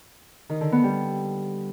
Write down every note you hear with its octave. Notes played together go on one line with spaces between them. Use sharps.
D#3
D3
B3
G3